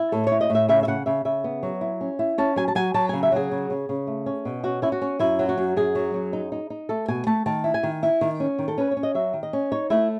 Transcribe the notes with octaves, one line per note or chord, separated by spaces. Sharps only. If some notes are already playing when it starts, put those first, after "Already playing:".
Already playing: E4
A2 A4
C#5
E4
D#5
A2
E5
C#3 E5
E5
C#3 F#5
C#3 E5
C#3 E5
B3
F#3
E4
C#4
E4
C#4 A5
F#3 G#5
A5
F#3 G#5
F#3 A5
C#3 G#5
E5
F#3 G#4
C#3
C#3
C#3
A3
C#4
B2
C#4 F#4
C#4 E4
F#4
C#4
F#2 E4
F#3
F#4
F#2
F#2 G#4
F#3
F#2
D#4
D#4
D#4
A3 A4
B2 G#5
A3 A5
D#3 A5
E4
G#5
D#3
E4
D#3
C#4
D#3
A4
C#4 B4
C#5
C#4
D#5
F#3 E5
D#3
D#5
C#4
D#4 C#5
A3 E4